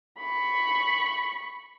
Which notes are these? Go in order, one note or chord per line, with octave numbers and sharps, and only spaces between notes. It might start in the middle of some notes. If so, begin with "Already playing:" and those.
B5 C#6